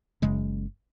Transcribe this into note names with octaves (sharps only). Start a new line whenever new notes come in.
F#1 F#2 C#3 G#3